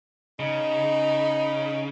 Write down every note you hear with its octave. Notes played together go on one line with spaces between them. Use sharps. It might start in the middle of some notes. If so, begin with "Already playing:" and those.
C#3 D#4